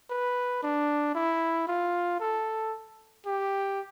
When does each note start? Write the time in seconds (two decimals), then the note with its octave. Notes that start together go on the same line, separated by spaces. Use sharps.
0.10 B4
0.63 D4
1.15 E4
1.67 F4
2.20 A4
3.26 G4